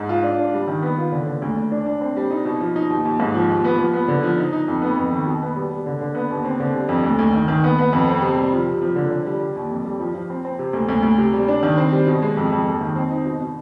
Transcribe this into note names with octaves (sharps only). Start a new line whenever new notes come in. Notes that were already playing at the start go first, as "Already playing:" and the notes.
Already playing: G#2
F4
D4
D4
G3
D#3
B3
F4
D3
D3
D2
D2
D4
D4
C4
G3
D#4
B2
F3
D#4
D#2
D#2
G#2
F3
D#2
B3
F3
B3
D3
F3
D#4
D#4
F2
B3
F2
D#3
B2
B3
G3
G3
D3
D3
B3
D#2
C4
D3
G3
F2
D2
D2
D#3
D#3
B3
B3
F2
C4
C3
G3
F3
C3
F3
D3
D3
G3
G3
D#2
F2
G3
F3
F3
C4
C4
C3
D2
D2
D2
C3
G3
D4
D#3
C4
G3
B2
G#3
F2
F2
D#2
D#3
C4
D#4
B2
B2